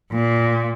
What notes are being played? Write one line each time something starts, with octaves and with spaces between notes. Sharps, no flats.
A#2